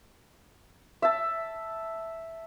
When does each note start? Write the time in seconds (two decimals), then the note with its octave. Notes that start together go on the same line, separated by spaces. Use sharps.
1.02 E5 A5